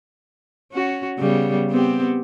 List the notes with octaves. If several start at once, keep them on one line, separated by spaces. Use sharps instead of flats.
C#4 F#4
C#3 G3 B3
B3 C4 G4